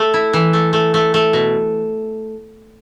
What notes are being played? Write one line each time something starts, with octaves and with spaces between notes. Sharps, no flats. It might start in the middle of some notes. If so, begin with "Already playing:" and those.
Already playing: A3
E4
E3
A3
A3
A3
A3
B2